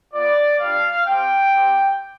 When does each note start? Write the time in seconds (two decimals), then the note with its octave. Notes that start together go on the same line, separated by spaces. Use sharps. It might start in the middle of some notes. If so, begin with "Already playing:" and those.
0.13 B3 F4 D5
0.60 G3 D4 F4 F5
1.06 C4 G4 G5
1.53 C4 G4